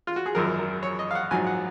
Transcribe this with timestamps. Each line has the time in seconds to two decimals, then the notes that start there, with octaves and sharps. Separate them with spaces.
0.07 F4
0.16 F#4
0.26 G#4
0.35 G#1 F#2 F3 A#4
0.59 A#4
0.83 C#5
0.99 D#5
1.11 F5
1.15 F#5
1.31 A#1 G#2 F#3 G#5
1.47 F#5